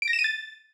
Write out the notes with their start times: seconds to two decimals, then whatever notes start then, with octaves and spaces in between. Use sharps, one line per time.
0.02 D7
0.08 A#6
0.13 E7
0.19 D#7
0.24 A6